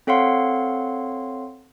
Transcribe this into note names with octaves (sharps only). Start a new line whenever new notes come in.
C4 A4 C#5 F5 F#5 C6